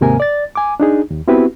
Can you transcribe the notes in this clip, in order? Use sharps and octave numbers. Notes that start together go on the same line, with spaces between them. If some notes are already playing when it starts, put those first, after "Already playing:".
D#2 G#2 C3 A#3 A#4 G#5
D5 A6
G#5 D6
D4 D#4 G#4
D#2
B3 C4 E4 F#4 G4 B4